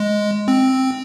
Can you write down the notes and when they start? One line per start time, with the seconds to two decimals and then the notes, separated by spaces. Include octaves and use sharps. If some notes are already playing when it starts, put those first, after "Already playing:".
Already playing: G#3
0.48 C4